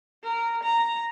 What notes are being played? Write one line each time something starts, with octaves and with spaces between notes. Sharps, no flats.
A#4
A#5